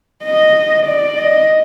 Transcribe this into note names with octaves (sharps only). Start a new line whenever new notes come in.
D#5
D5
D#5